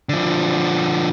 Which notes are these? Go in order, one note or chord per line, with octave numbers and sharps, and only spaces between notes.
D3 F3